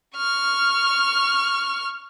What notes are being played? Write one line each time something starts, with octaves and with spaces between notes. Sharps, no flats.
C#6 F6